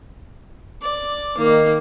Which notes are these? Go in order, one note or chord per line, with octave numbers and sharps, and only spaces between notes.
D5
D#3 A#3